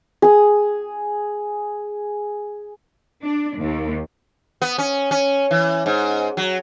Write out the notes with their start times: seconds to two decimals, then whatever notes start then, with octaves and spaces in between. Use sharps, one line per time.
0.22 G#4 D#6
3.23 D4
3.57 D#2
4.62 B3
4.78 C#4
5.11 C#4
5.51 E3
5.86 G#2
6.37 F#3